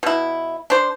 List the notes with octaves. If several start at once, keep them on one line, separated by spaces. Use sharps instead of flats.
B2 E4
D4 C5